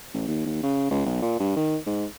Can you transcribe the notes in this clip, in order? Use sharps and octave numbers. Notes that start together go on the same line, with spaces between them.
A1
D#2
D#2
C#3
C#2
B1
A#2
G2
D#3
G#2